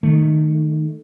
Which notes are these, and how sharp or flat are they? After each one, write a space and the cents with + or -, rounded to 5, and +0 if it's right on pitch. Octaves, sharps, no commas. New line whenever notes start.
D#3 -15 A3 +0